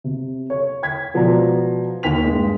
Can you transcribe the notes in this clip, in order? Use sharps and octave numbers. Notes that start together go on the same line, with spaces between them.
C3
C#5
G5 G#6 B6
B2 F3 G#3 D5 A#5
D#2 G5 B6 F7
G2 G#3